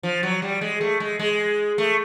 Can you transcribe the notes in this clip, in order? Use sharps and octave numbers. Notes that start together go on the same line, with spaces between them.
F3
F#3
G3
G#3
A3
G#3
G#3
A3